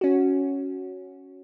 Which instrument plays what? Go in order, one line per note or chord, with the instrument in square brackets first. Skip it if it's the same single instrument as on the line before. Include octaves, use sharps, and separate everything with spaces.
[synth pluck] C#4 F#4